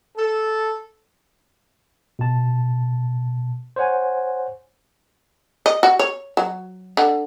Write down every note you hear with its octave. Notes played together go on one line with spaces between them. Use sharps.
A4
B2 A5
C5 C#5 F#5 G#5
D#5
F#4
C#5
F#3
D3